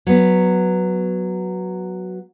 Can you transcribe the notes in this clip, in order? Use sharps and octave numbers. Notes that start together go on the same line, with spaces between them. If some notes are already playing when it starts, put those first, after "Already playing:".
F#3 B3